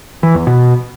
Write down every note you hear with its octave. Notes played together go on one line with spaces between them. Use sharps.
E3
E2
B2